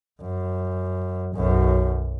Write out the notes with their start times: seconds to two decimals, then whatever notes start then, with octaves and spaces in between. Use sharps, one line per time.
0.22 F#2
1.35 B1 F#2